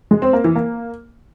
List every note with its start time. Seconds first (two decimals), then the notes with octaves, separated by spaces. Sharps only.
0.11 G#3
0.22 C4
0.33 A#3
0.44 E3
0.56 A#3